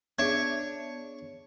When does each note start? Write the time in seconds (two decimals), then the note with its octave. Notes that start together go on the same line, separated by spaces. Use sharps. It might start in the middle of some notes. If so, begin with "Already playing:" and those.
0.19 B3 D4 G#4 C#5 E5 C#6 G#6